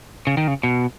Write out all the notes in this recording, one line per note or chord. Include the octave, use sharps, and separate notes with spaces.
C#3
D#3
C#3
B2